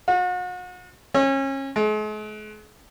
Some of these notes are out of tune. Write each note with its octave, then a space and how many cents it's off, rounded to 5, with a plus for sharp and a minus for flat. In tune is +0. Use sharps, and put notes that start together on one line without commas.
F#4 -40
C#4 -30
G#3 +45